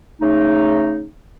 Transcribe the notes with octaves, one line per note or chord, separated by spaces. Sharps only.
C#3 A3 D#4